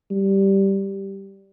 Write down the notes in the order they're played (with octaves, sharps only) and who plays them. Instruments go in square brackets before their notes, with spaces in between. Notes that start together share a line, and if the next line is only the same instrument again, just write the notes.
[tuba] G3